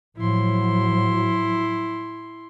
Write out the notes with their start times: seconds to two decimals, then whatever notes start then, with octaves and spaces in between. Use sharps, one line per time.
0.17 A2 F3 F#3 E4 C6